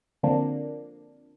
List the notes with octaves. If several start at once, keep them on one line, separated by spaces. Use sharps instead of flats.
D3 F3 A#3 C4 D4